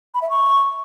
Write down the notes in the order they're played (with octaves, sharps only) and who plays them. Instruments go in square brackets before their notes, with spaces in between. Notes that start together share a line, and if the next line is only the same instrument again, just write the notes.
[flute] B5
E5
C#6